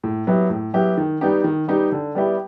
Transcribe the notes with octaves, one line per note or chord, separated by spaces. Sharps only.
A2
F#3 B3 E4 G4
A2
F#3 B3 E4 G4
D#3
G3 B3 D#4 G4
D#3
G3 B3 D#4 G4
D3
G3 B3 E4 G4